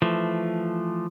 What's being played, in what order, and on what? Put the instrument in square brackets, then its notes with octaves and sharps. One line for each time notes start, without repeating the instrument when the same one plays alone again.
[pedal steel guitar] E3 F3 A3